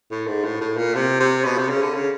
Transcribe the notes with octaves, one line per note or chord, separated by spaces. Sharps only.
A2
G#2
A2
A2
A#2
C3
C3
B2
C3
C#3
D3
C#3